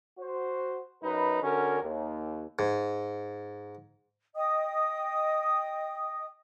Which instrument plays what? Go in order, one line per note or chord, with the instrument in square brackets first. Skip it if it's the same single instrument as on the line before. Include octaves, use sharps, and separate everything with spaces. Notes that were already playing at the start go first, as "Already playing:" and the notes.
[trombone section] F#4 C5
F#2 D#4 B4
D3 C#4 F#4 A#4
D#2
[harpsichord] G#2
[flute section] D#5 G5 D#6